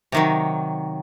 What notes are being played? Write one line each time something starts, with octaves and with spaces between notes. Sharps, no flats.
C3 D#3 F#3